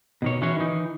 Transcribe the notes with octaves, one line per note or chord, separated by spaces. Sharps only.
B2 D#3 C#5
E3 C#4 F#4 G#4 C#5
D#3 E3 D#4